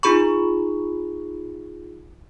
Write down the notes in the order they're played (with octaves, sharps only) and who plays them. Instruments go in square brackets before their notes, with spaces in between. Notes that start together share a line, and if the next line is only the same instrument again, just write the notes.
[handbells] D#4 F4 G#4 B5 C#6